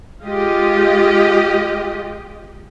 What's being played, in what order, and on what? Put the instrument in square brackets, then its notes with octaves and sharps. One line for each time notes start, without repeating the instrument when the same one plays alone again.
[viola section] G#3 F4 G4 D#5